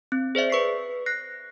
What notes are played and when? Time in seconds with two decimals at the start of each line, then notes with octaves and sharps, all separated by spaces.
0.12 C4
0.35 G#4 C5 D5 E5
0.50 B4 C#6 B6 C7
1.06 F#6 A#6 C7